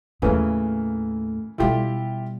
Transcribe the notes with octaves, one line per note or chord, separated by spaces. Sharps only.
D#2 A2 C#3 E3 A#3
B2 G3 E4 F4 G4